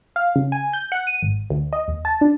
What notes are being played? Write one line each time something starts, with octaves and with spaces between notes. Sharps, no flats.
F5
C#3
G#5
G6
F#5
D#7
G#1
D2
D#5
D#2
A5
D4